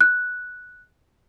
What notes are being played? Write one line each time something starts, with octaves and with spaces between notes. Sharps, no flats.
F#6